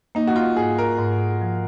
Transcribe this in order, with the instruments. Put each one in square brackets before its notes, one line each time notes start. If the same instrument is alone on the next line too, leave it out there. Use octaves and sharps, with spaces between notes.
[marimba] A#3 [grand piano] D#4
[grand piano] F#4
F4
[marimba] G#2 [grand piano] G#4
[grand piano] A#4
[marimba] G#2
F3